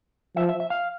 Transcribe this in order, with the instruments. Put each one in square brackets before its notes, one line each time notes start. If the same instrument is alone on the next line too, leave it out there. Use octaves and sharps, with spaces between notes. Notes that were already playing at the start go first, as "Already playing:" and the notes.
[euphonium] F3 [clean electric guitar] E5
[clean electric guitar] E5
E5
F5